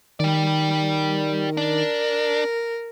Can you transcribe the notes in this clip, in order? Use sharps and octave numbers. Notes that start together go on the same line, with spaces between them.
D#3 G4 D5
D4 A#4